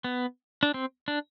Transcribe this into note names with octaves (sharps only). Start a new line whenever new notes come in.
B3
D4
C4
D4